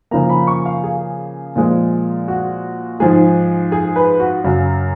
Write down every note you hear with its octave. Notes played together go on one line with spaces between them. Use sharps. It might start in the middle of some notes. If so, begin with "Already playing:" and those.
C#3 F3 A#3 A#5
B5
C#6
F5
G#4
A#2 F3 G#3
F#4
G#2 F3 G#3 G#4
G#4
B4
F#4
F#2 C#3 F#3